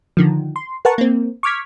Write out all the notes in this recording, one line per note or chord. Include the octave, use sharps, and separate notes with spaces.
D3 D#3 F3
C6
A#4 B4 F#5 A5 C#6
A#3 C4
C#6 D6 F6 G#6 B6